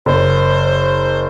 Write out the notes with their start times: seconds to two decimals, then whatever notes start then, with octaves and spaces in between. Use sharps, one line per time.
0.06 F#1 C5